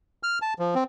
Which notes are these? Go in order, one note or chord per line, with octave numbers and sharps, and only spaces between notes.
F6
A5
F3
C4